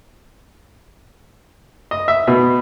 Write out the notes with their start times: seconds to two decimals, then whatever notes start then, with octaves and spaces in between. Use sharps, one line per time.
1.91 D#5
2.08 E5
2.27 B2